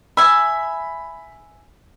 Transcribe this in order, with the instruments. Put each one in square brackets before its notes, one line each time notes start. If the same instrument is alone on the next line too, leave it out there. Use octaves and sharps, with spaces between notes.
[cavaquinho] E5 G#5 [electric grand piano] B5